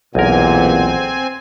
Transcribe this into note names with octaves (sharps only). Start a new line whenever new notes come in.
B1 E2 A#2 C4 A#4 F#5 G#5